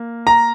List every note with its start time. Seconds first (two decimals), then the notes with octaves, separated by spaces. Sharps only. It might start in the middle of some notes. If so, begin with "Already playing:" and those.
Already playing: A#3
0.27 A#5